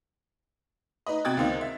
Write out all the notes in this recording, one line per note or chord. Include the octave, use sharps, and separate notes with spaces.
D#4 B4 D#5
C3 F#4 G5 D#6 G#6 A6
C#2 D#3 C4 D#5 F5
E5